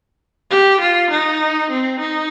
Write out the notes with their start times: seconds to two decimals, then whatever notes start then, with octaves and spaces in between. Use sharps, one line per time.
0.51 G4
0.80 F4
1.10 D#4
1.71 C4
2.00 D#4